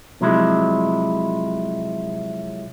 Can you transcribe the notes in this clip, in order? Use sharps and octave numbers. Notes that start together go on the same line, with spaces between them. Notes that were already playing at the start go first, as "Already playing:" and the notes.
C3 F3 F#3 G#3 E4